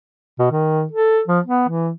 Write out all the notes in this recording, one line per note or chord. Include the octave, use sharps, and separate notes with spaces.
B2
D#3
A4
F3
B3
E3